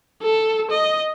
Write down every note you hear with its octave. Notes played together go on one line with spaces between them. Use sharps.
A4
D#5